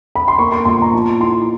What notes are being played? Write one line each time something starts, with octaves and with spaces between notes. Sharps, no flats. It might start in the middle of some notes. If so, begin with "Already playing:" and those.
B5
C6
A#3 C#6
C6
A#2 C6
A#5
F3 A5
E4 C6